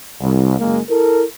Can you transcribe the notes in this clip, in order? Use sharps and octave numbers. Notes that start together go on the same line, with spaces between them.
C2
F#1 G#3 A#3
E4 A4 A#4